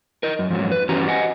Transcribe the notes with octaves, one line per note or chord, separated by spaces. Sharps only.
A#4 D#5
F#2
F2 G#2 F#3
B4
G2 E3 C#4 F#4 G4 A#5
D#5 F#5 G#5